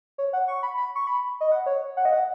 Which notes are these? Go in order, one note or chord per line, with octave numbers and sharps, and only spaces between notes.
C#5
F#5
C#6
B5
B5
C#6
B5
D#5
F#5
C#5
F#5
D#5
F#5